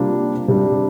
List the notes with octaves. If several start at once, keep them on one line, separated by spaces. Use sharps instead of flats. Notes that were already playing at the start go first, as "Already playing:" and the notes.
Already playing: C3 G3 A#3 D4 F4
C3 G3 D4